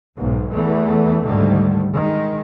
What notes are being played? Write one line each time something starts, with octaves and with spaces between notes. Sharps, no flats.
B1 G#2
E2 E3 A3 B3
D2 G#2 D3 D#3 G3 A3
D#3 G#3